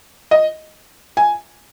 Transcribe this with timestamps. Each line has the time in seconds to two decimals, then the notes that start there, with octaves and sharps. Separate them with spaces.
0.31 D#5
1.17 G#5